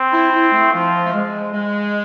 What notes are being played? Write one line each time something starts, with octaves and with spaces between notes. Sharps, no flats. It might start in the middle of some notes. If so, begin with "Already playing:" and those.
Already playing: C4
E4
E4
A3
F3 F4
A3
G#3
G#3